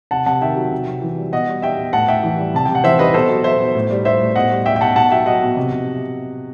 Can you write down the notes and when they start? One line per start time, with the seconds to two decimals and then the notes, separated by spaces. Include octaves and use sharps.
0.11 C3 F#5 A5
0.26 C3 F#5 A5
0.42 D#3 E5 G5
0.57 F#3
0.72 C3
0.87 C3
1.02 E3
1.17 G3
1.33 B2 D#5 F#5
1.47 G3
1.62 G3 E5 G5
1.78 B2
1.93 A2 F#5 A5
2.08 A2 E5 G5
2.23 E3
2.38 G3
2.54 C3 A5
2.65 C3 G5
2.75 F#5
2.84 E3 C5 E5
2.99 G3 B4 D#5
3.14 B2 A4 C5
3.29 F#3
3.44 F#3 C5 E5
3.60 B2
3.75 A2
3.90 G3
4.05 G3 C5 E5
4.20 A2
4.36 B2 D#5 F#5
4.51 G3
4.66 G3 E5 G5
4.76 G5
4.81 B2 F#5 A5
4.96 B2 F#5 A5
5.11 F#3 E5 G5
5.26 F#3 D#5 F#5
5.42 B2
5.57 C3
5.72 C3